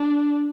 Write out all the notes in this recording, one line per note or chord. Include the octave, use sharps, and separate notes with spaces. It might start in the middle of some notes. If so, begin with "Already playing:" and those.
Already playing: D4